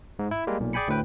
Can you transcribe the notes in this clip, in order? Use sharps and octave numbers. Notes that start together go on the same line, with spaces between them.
G#2
E4
G3 G#3 A#3
B1 A#2
G#4 D5 G5 G#5 B5 C#7
D2 A2 B4 G5